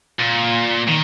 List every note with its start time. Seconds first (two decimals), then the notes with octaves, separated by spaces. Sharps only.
0.20 A#2
0.88 D#3